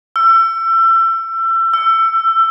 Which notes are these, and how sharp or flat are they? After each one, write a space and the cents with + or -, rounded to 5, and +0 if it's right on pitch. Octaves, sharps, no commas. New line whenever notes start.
E6 +30
E6 +20